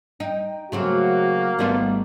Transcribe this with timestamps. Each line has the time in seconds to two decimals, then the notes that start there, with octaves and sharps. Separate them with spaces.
0.20 D#4 G5
0.72 C#3 F#3 A3 A#3 C4 F#4
1.59 G#1 D#3 G3 A3 B3 F4